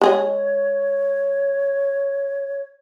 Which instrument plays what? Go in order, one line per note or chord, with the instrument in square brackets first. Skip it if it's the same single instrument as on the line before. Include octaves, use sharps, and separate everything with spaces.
[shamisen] G#3 G#4 D#5 [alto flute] C#5